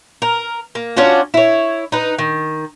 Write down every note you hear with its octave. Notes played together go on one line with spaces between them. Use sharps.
A#4
A#3
C#4 D4 F4 F#4
E4 C#5
D#4 B4
D#3